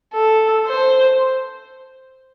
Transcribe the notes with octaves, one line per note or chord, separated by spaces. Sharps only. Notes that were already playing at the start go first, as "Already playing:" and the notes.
A4
C5